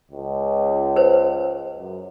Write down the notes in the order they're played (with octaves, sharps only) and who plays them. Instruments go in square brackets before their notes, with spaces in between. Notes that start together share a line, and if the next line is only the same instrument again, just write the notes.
[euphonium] C#2
[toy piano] B4 C5
[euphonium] F#2